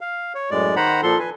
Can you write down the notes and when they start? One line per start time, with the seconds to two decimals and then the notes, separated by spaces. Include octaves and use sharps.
0.01 F5
0.35 C#5
0.51 F#2 A2 G#3 D5
0.76 D#3 C5 F#5 A#5 B5
1.03 A#2 F3 A4 C6
1.19 B4 G#5